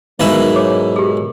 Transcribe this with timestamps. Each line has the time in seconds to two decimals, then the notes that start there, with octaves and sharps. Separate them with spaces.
0.20 G#2 B2 F#3 E4 A#4 F5
0.56 C#5 D6
0.96 G4 G#4